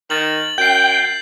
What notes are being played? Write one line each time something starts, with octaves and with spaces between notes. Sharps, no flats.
D#3 A6 F#7
F#2 G5 G6 C7